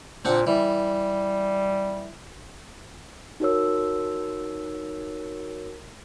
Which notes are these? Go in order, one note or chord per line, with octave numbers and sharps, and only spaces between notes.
A#2 C4 D4 F#5
E3 G3
D#4 F#4 A#4 C#5 E6